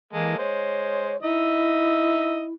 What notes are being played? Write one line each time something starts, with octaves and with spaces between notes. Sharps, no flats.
E3 G#3 A#3 A4
G#3 C5 C#5
D#4 E4 D#5 E5